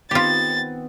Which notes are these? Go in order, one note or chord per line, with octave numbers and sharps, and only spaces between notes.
D#3 B3 C4 F4 G4 A6